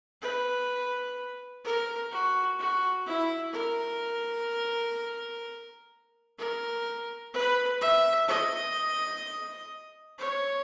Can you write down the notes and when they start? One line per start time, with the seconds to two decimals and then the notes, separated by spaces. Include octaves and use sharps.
0.22 B4
1.64 A#4
2.11 F#4
2.59 F#4
3.06 E4
3.53 A#4
6.38 A#4
7.33 B4
7.81 E5
8.28 D#5
10.18 C#5